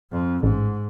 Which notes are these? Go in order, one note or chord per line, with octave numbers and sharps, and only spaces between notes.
F2
A1 G#2